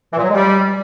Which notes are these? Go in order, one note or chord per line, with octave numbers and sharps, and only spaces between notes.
E3
A#2
F#3
G#3
G3